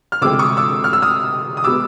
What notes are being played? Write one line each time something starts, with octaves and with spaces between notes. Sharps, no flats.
F6
D2 C3 F3 G#3 C4 D6 E6
C#6 D#6
D6 E6
F6
E6
D#6 F6
D#6
B2 G#3 B3 D6 E6